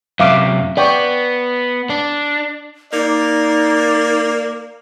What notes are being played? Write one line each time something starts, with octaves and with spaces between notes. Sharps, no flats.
F#2 C3 E5 F5 D6
B3 D5 G5 C#6
D4
A#3 D#4 D5